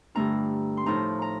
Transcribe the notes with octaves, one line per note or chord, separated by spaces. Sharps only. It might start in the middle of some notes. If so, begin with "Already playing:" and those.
G2 D3 A3 D4 F4 A#5
C6
A2 F3 A3 D#4 A#5
A#5